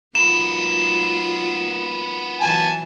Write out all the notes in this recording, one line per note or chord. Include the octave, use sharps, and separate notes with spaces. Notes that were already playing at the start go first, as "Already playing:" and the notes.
F#3 A#3 B3 D#4 F4 E7
E3 F#3 G#5 A5